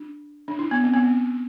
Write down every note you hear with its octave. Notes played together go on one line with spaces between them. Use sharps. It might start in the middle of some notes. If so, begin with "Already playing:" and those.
Already playing: D4
D4
E4
B3
C4
B3
C4